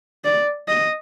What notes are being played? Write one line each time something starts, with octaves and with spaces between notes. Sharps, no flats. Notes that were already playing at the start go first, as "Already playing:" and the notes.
D5
D#5